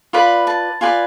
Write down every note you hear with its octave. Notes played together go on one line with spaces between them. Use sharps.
F4 B4 D5 B5
A5
F4 B4 D5 G#5